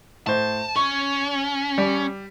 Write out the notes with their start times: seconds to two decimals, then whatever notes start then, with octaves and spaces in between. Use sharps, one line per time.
0.27 A2 C5 A5
0.76 C#4 C#6
1.78 G3